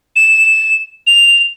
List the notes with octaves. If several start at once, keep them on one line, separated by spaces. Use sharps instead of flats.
E7
F7